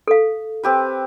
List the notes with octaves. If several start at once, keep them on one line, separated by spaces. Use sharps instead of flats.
A4 F5
C4 G4 B4